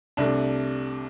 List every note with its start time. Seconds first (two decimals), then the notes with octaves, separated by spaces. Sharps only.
0.17 C2 C3 A3 D4